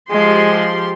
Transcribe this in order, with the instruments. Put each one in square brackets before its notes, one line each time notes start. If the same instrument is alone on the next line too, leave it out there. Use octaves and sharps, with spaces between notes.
[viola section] F3 G4 C6 [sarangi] G#3